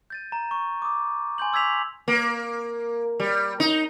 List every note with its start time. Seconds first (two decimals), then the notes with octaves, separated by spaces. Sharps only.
0.10 G6 A6 D#7
0.32 A#5
0.51 C#6
0.82 D6 D#6
1.38 G#5 C6 G6 F#7
1.53 D6 E6 G#6 B6 F7
2.08 A#3
3.20 G3
3.60 D#4